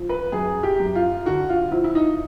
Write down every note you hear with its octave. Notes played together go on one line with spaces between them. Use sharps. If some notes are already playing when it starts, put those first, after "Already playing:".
Already playing: F3
B4
F#2 G#4
G4
F#2
F4
D3 F#4
F4
F3 E4
E4
D#4